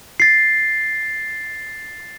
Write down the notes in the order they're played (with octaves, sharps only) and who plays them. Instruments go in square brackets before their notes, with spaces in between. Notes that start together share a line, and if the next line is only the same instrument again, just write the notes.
[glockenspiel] A6 C7